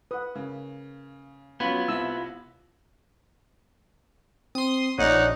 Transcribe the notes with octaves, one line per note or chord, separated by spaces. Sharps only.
B4 F#5 D#6
C#3 A#3
F#3 B3 C#4 F4 F#4 B5 G#6
C2 C3 E4 E6
C4 C6 D#6
A#1 D#4 C#5 D5 F#5